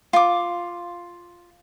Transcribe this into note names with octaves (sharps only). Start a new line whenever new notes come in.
F4 D6